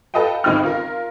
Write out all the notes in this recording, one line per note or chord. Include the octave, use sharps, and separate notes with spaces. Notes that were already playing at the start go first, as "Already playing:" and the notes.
A4 B4 D#5 F5 G5
G#1 C#2 D#4 C5 G5 F6
F4 A#4